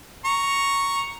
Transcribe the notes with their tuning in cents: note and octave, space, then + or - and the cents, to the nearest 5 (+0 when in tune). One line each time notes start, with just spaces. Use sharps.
A#5 +0 C#6 +0